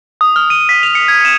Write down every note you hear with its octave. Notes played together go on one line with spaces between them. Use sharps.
D#6
F6
D#7
B6
F7
C#7
G#6
E7